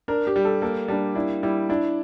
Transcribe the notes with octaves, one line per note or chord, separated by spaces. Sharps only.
D4 A#4
G4
G3
A4
A#3 A4
G3 D4
D4 E4
G3 E4
D4 E4